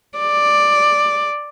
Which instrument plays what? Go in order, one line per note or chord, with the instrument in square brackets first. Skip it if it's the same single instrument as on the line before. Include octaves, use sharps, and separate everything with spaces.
[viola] D5